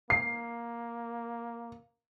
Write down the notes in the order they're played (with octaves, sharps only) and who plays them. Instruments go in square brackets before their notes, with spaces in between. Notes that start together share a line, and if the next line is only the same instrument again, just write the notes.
[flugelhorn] A#3 [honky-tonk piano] C7